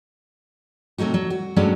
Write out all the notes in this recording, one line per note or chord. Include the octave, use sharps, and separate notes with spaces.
C3 F#3 A3 D#4 F#4
F#3
F#4
G2 F#3 G#3 A3 C#4 D4